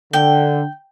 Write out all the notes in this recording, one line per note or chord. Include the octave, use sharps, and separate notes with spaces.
D3 G5